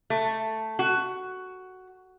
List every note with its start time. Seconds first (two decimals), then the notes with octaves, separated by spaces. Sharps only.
0.10 A3
0.79 F#4